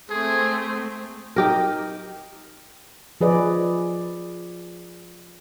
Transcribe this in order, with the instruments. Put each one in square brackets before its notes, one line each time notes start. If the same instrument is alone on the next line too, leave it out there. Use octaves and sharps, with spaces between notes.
[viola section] A3 C4 [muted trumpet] G#4
[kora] D#4 G4 A#4
[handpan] F3 G#4 B4 D5 D#5